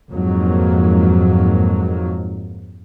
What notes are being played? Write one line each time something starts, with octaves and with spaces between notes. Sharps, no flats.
F2 G#2 F#3 A#3